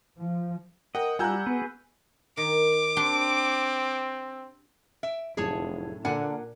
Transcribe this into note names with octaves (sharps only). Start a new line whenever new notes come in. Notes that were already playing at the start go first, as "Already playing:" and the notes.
F3
A#4 D#5 F#5 G5
G3 F4 F#5 G#5 A#5 E6 F#6 G6
B3 F#4 G#4 B4
D#3 D6
C4 D4 G4 C6
E5 D7
F1 F#2 A2 D3 G#4 C#5 A5
A#2 D3 D4 A#4 F#5 G#5